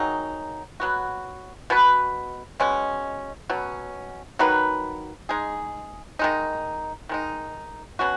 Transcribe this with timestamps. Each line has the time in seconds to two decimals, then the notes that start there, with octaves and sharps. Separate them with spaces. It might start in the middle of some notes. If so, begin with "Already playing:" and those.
Already playing: D#3 F#3 D#4 G#4
0.80 F#3 B3 F#4
1.70 B2 B3 F#4 B4
2.60 B2 G#3 C#4
3.50 B2 F#3 C#4
4.39 D#3 F#3 D#4 B4
5.29 G#3 D#4 G#4
6.19 D#3 G#3 D#4
7.09 D#3 G#3 D#4
7.99 B2 F#3 C#4 F#4